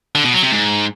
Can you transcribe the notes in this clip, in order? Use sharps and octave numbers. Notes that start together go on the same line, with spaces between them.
D3
B2
F#3
C3
G#2